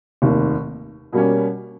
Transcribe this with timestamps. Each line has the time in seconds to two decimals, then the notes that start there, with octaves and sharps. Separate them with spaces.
0.22 F1 D#2 D#3
1.13 B2 G3 A#3 C#4